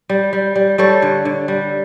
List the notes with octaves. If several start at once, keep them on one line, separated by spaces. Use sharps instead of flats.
G3
G3
G3
G3 A4 C#5
D3
D3
G3